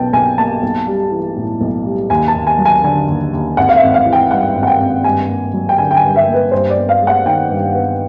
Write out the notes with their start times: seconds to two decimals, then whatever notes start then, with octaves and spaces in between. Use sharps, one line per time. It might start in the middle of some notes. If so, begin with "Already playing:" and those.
Already playing: B1 B2 F#3 G5 A5
0.13 B1 G#5
0.38 A#3 A5
0.63 B1
0.87 G3
1.11 E3
1.37 A2
1.61 B1
1.86 G3
2.10 D#2 G#5
2.28 A5
2.35 D#2
2.47 G#5
2.59 F#3
2.65 G#5
2.84 D3 G#5
3.08 D#2
3.33 D#2
3.57 G#1 F#5
3.69 F5
3.76 E5
3.82 G#1
3.94 F5
4.06 E3
4.13 G5
4.31 G2 F#5
4.56 G#1
4.63 F#5
4.67 G5
4.80 G#1
5.04 G2 G#5
5.29 A#3
5.54 F#3
5.69 G5
5.78 D3 G#5
5.91 G5
5.97 G#5
6.03 G2
6.16 E5
6.28 A#3
6.34 B4
6.52 G2 C5
6.70 D5
6.76 B3
6.89 F5
7.02 G#3
7.07 F#5
7.26 D#3 G5
7.51 G2
7.75 B3